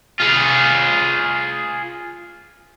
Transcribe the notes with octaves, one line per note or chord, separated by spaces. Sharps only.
F4 G#4